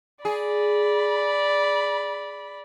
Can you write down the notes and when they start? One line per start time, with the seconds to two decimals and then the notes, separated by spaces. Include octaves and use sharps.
0.25 G#4 D5 B5